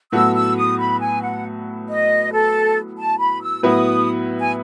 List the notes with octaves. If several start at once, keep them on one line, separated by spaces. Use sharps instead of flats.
A2 F#3 B3 F#4 A4 E6
E6
D#6
B5
G#5
F#5
D#5
A4
A5
B5
E6
A2 F#3 B3 E4 B4 D#6
G#5